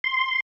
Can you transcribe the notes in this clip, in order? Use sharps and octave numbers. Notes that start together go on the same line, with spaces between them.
C6